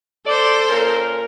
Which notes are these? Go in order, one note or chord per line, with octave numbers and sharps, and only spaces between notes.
A4 C5 D5
A#2 C#4 A#4